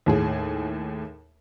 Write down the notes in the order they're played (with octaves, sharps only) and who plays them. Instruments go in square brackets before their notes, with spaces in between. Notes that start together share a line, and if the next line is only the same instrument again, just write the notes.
[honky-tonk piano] D#2 A2 G#4